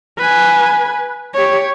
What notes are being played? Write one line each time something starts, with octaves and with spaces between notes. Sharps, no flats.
B4 G#5
G4 C#5